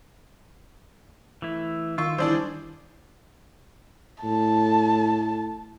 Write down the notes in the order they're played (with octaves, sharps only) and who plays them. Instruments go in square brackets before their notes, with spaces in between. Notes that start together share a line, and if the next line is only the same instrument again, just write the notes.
[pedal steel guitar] E3 A3 E4
[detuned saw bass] D#3 [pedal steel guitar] F4 [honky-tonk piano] C#6 E6
[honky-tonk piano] E3 D4 C5 [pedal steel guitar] G3 G#4 D5
[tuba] A2 [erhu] A5